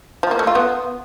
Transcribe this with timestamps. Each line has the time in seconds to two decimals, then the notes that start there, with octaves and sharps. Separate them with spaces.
0.23 F3
0.31 A#3
0.39 A3
0.47 F4
0.55 B3